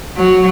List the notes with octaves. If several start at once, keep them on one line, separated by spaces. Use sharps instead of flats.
F#3